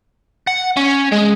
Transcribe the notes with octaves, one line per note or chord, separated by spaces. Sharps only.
F#5
C#4
G#3